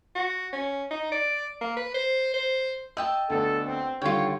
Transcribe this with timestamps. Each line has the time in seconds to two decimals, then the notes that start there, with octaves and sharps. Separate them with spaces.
0.15 F#4
0.53 C#4
0.91 D#4
1.12 D5
1.61 A#3
1.77 B4
1.94 C5
2.34 C5
2.97 D#5 G5 A5 E6
3.30 D2 B3 D4 A4
3.66 C4
4.02 D3 D#3 G3 F4 C#5 G5